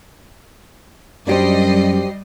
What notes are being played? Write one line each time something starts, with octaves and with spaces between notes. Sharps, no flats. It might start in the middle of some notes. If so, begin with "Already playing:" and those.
F#2 G3 D4 G4 C5 D#5 C7